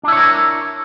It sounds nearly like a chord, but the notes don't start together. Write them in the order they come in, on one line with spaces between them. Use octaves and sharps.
D4 E4 C#5 A#4